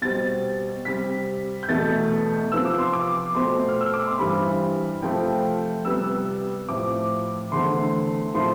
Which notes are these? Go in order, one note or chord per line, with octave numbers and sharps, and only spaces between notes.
B2 G3 C4 A6
C3 G3 C4 B6
G6
E2 B2 A3 A6
C3 F3 B3 E6
D6
C6
D6
B2 A3 C4 C6
F6
E6
D6
C6
G2 E3 G3 C4 B5
C3 F3 A3 C4 G5
C3 G3 B3 E6
A2 F3 C4 D6
E2 D3 A3 C4 C6
A2 F3 A3 C4 C6